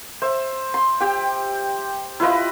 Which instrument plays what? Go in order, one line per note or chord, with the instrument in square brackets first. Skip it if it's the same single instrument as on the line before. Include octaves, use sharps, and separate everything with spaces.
[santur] C5 E5
C6
G4 G5
E4 F4 B4 D#5